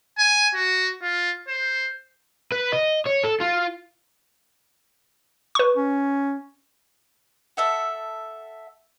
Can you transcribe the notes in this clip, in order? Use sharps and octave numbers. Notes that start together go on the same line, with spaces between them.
G#5
F#4
F4
C5
B4
D#5
C#5
A4
F4
B4 C#6
C#4
A4 E5 F#5